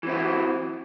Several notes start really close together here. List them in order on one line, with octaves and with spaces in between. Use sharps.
E3 C4 E4 F#3 F#4